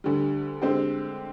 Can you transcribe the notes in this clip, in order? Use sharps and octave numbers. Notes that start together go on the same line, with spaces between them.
D2 D3 G3
D3 G#3 C4 G4 C5